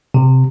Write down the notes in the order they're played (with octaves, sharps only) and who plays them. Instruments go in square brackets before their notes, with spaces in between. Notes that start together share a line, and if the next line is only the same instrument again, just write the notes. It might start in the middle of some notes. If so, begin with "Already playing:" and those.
[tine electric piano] C3